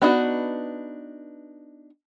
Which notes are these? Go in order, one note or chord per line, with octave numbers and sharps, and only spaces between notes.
B3 D4 D#4 F4 F#4